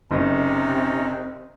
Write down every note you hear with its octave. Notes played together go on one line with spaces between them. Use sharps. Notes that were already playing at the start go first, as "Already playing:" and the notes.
F#1 C3 C4 C#4 D#4